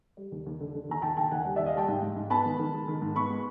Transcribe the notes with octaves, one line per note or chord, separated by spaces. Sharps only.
G3
D#2
D#2
D3
D3
D#2 A#5
D#2 G5 A5
D#2 G5 A5
D#2 F#5 G#5
G3
D#2 D5 E5
D#5 F5
G3 G5 A5
G#2
G#2
G#2
B3 A5 B5
D#3
D#3
G#3
D#3
G#2
B3 B5 C#6
G#3